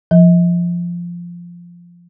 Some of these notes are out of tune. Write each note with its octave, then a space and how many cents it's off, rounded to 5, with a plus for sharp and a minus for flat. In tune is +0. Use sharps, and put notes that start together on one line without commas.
F3 -10